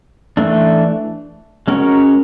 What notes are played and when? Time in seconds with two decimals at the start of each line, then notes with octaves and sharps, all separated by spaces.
0.37 E3 A3 D4
1.68 G#3 C#4 F#4 A#4 C#5